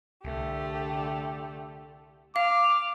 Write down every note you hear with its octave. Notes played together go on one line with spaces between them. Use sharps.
C2 D3 A3 G4
F5 D6 F6